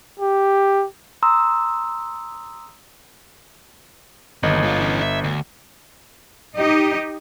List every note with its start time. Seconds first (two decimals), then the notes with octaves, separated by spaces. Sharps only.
0.19 G4
1.23 A#5 C6 D#6 E6
4.43 G1 D#2 D#5
4.63 G#2 F4
4.78 E3 C#4
5.02 E5
5.24 D2
6.55 D#4 G4 D#5